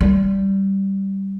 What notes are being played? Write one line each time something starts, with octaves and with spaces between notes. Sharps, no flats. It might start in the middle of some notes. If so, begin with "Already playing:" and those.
G3